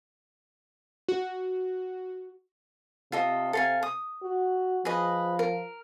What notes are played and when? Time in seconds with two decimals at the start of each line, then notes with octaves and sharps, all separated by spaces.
1.09 F#4
3.12 C3 F4 A4 D#5
3.53 A4 F5 G#5
3.83 D#6
4.23 F#4
4.85 F3 G#4 B4 D#5
5.39 A#4